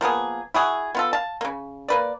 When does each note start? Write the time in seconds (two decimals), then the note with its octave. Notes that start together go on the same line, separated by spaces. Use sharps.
0.01 F3 A#3 B3 G#4
0.54 E4 F#4 G#4
0.95 B3 F4 A4
1.13 F5 A5
1.41 C#3 A#3
1.88 A#3 B4 D5